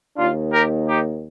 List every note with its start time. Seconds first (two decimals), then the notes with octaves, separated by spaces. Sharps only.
0.17 D#2 D#3 A#3 D4 F4
0.53 G4 A#4
0.88 D#4 G4